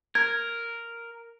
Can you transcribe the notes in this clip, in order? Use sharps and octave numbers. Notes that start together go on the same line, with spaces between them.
A#4 G#6